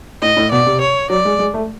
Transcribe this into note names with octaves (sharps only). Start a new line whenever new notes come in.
A2 D#5
A2
B2 D5
C3
C#5
F#3 D5
G#3
G#3
A3